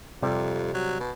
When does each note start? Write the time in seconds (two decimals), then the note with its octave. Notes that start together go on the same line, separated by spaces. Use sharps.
0.22 F2 C3 G3
0.74 F#3
1.00 B2